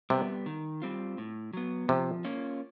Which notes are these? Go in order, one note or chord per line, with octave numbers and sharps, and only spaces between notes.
C3 G3 B3
D#3
G3 C4 F4
A2
F#3 B3
C3 F3
A#3 C#4 F4